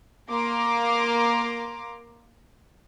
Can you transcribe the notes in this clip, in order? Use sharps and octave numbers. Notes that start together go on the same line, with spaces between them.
A#3 A#5 C6 D6